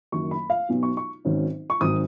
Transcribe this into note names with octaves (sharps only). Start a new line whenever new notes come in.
F#1 F#2 D#3 C#6
B5
F5
B1 B2 F#3
C#6
C#6
G#1 G#2 D#3 F#3 C#4
C#6
G#1 G#2 D#3 F#3 D#6